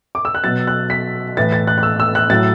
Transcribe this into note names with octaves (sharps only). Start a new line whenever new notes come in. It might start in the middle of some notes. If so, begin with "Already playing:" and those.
D6
E6
F#6
B2 F#3 A6
F#6
B6
A2 E3 A6
A6
F#6
F#6
E6
E6
F#6
A2 F#3 A6